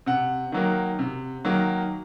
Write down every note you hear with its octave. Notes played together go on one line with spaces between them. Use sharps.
C3 F#5
D#3 F#3 A#3
C3
D#3 F#3 A#3